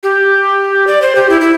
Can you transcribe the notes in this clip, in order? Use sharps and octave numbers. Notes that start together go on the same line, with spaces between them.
G4
D5
C5
G4
E4
E4